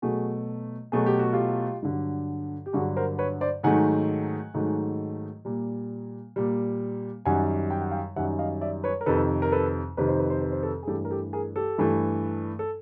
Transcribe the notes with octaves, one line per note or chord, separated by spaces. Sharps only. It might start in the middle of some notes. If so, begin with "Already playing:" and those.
B2 F#3 A3 F#4 G#4
B2 F#3 A3 G#4
G4
F#4
F4 G4
G2 D3 F#3
G4
G2 D3 F#3 F#4 G#4
A#4 C5
B4 C#5
C5 D5
G#2 D#3 F#3 A3 F#5 G#5
G#2 D#3 F#3 A3
A#2 G3
A#2 G3
F#2 D#3 G3 F#5 G#5
G5
F#5
F5 G5
F#2 D#3 G3 E5 F#5
D#5 F5
D5 E5
B4 C#5
A#4
F2 C3 D#3 A4 B4
A#4
A4 B4
F2 C3 D#3 B4
C5
B4
C5
B4
C5
A4 B4
G#4
G2 E3 A3 G4 A4
A#4
G4 A4
G#4 A#4
G4 A4
G2 E3 A3
A4